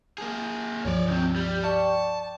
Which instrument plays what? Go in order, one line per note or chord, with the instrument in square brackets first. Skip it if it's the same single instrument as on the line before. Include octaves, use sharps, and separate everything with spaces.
[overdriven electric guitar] A#3 G#4
[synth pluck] C#2 G2 F3 [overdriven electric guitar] C#5 D5
[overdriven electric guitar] C#3 C4
G3
[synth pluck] D5 G5 C#6 [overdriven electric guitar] A5